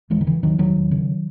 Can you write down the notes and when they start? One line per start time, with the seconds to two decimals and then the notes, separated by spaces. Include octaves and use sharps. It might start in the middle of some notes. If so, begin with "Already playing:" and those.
0.10 E1 E3 G#3
0.21 D#3
0.27 C#3 E3
0.43 D#2 D#3 F#3
0.58 E1 D#3 F#3
0.76 E1
0.91 C#3